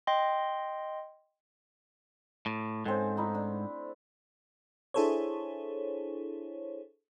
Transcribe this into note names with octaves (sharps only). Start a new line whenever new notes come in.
D#5 G5 C6
A2
G#2 C4 C#4 A4
A3 D#4 E4
D4
D4 E4 G#4 A4 C5 C#5